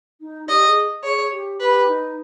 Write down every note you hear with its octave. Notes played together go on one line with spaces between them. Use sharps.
D#4
G4 D#5
G#4
G#4 C#5
G4
G4 B4
D#4